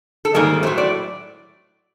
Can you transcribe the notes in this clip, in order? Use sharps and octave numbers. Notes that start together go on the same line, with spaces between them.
A4
G#2 D#3 G3 A#3 G#4
A2 F#3 A3 C5
D5